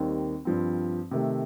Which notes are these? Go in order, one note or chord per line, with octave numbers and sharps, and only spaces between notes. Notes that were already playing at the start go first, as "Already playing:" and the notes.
Already playing: D#2 D#3 G3 C4
G2 F3 C4
C3 D#3 A3